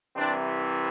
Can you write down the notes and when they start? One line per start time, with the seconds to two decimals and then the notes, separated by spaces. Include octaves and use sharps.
0.15 C2 C3 E3 C4 D4